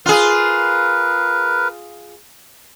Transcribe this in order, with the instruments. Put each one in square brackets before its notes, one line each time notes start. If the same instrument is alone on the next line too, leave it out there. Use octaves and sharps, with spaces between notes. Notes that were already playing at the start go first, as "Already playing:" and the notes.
[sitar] F4 G#4 [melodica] A#4 B4